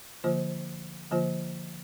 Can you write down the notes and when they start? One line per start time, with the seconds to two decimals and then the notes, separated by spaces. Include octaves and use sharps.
0.24 D3 F3 A#3 F4 C5
1.11 D3 F3 A#3 F4 C5